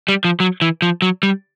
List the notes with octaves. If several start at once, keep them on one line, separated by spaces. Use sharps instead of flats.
G3
F3
F#3
E3
F3
F#3
G3